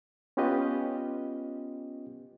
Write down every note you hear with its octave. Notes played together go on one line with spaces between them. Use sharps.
B3 C#4 F4 G4 B4 D#5